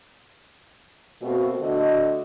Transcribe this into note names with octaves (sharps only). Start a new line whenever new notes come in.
B2 A3 A#3 C4 F#4
D3 A3 F#4 D#5